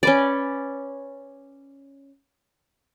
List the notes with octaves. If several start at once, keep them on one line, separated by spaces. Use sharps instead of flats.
C#4 B4 D5